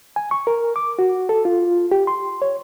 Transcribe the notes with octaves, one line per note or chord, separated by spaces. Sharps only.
G#5
C#6
A#4
D6
F#4
A4
F4
G4
C6
C#5